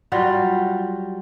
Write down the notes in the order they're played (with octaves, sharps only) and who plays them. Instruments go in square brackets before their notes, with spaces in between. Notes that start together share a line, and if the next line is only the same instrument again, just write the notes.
[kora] F#3 G3 F4 F#4